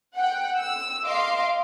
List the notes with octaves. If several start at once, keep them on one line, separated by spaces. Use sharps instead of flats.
F#5 G5
E6
D#5 F5 C6 D6